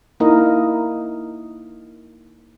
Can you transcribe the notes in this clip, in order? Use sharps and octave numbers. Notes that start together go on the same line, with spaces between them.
A#3 D#4 E4 A#4 D#5